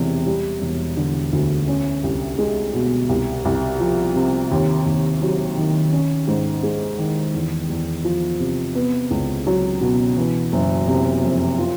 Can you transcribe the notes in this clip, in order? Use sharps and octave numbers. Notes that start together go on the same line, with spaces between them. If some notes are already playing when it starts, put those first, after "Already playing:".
Already playing: E1 E2 C3
G3
E1
D3
D2
C#4
C2
G#3
B2
C2
C2
F3
C3
D#2
D#2
F#3
D#3
C#4
G#2
G#3
D#3
E2
E2
F3
C3
B3
C#2
F#3
B2
E3
F#1
C3
F2
F4